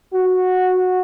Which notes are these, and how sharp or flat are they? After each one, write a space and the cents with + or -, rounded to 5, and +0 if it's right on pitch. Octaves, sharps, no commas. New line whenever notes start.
F#4 -10